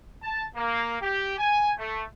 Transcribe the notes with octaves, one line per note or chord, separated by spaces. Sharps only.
A5
A#3
G4
G#5
A3